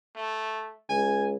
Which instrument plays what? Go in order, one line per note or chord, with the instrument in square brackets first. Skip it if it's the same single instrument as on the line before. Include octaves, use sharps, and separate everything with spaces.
[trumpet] A3
[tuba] C#2 [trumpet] G#5